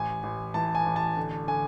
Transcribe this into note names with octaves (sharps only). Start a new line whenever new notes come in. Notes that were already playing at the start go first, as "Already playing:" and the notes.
Already playing: A1 G#5
A1
E3 A5
G#5
A1
A5
D3
D3 G#5